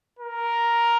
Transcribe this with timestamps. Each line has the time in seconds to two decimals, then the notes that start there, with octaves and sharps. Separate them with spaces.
0.19 A#4